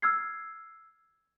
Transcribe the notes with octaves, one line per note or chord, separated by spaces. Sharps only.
E6 F6 G#6 C7